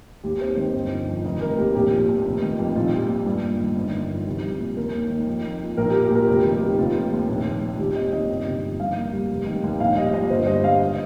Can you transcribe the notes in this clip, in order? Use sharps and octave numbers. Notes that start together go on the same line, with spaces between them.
D#2 G4
C4 C5
D#3 C5
G1
F3
F2
F1 D#5
D#3 A#4
D#2 G4
A#1 G4
F3
A#2
F1
D#3
F2
A#1 F4
G3
A#2
G2
A#3
D#3
G1
D#3
F2
C2
G3
A#2
D#2 A#4
A#3
D#3
F2
A#3
F3
A#1 A#4
G4
F3
G4
A#2 A#4
F1 G4
D#3
G4
D#2
F1 F4
D#3
D#2
A#1
A#3
A#2
D#2 G4
C4 D#5
D#3 D#5
G1 D#5
C3
F2
G2 F5
A#3
G3
F1
D#3
D#2
A#1 F5
G3 D#5
A#2 D#5
G1 C5
G3 D#5
G2 F5
D#5